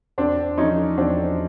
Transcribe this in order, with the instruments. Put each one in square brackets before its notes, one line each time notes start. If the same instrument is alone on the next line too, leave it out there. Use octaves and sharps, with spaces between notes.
[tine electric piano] E2 [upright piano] C4 D4
[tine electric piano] F3 [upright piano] C#4 D#4
[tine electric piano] E2 [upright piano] C4 D4